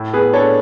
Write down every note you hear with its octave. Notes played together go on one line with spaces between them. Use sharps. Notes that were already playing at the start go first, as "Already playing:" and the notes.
Already playing: A2
B3 G#4 B4
D4 A4 C#5